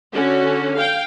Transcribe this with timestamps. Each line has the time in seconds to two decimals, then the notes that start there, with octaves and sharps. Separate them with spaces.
0.14 D3 C#4 F#4
0.76 F5 G5